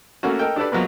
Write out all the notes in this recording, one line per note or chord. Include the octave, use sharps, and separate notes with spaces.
A3 A#3 C#4 F#4
A4 A#4 D#5 G5
D4 G4 A4 B4 D5
F3 F#3 G#3 A#3 B3